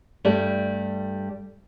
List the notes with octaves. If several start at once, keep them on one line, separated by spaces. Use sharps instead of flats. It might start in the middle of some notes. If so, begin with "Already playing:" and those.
G2 G3 A3